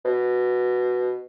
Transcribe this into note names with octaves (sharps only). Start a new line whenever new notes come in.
B2